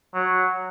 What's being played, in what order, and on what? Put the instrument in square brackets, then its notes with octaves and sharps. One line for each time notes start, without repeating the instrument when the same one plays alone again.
[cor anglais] F#3